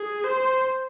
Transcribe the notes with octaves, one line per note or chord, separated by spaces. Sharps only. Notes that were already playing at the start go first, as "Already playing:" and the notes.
Already playing: G#4
C5